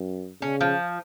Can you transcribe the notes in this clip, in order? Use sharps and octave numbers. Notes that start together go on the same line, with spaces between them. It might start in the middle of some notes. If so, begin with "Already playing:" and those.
Already playing: F#2
C#3 C#4
F3